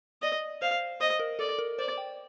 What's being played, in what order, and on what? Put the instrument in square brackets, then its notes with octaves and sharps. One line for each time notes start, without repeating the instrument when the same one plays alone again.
[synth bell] D5 [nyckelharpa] D#5
[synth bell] C5 [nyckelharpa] F5
[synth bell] C5 [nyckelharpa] D#5
[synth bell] A#4
[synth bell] A4 [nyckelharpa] D5
[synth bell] A#4
[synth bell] C5 [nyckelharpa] D5
[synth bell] G5